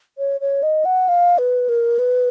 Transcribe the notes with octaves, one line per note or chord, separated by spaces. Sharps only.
C#5
C#5
D#5
F#5
F5
B4
A#4
B4